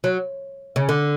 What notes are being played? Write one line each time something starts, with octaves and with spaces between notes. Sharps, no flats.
F#3
C#3
D3